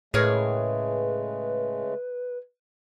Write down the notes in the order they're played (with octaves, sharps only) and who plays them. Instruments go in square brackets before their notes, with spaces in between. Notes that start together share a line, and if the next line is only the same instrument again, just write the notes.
[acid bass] A2 [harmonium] C#3 G#3 A3 [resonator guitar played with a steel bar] G#4 A#4 C#5 [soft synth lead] B4